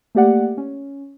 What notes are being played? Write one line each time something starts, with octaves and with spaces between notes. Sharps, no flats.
A3 A#3 G4 D5 F#5
C#4